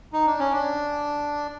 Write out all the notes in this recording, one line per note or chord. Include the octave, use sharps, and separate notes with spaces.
D#4
D4
C#4
D4